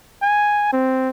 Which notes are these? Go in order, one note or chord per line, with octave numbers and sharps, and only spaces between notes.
G#5
C4